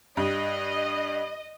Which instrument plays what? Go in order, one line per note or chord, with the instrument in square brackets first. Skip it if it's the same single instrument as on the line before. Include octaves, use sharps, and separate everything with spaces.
[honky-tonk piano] G2 [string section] D#5